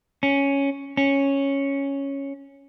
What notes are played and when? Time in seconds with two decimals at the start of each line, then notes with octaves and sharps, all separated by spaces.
0.23 C#4
0.97 C#4